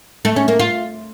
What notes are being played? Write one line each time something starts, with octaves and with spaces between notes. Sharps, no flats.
A3
C#4
A#3
F4